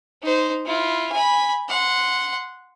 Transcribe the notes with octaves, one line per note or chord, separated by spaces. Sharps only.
D#4 C5
E4 F4
G#5 B5
F#5 C6